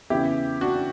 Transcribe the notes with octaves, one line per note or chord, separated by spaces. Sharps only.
E2 C#3 E3 E4 G4
D4 F#4